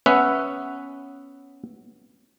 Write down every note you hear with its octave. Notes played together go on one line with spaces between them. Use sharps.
B3 C#4 E5 F#5